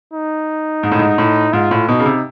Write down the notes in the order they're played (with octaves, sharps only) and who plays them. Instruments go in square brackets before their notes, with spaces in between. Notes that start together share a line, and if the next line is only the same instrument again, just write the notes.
[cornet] D#4
[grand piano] G#2
A2
G#2
A2
[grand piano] G#2 [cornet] F4
[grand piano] A2
[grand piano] B2 [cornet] D#4
[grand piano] C#3
C3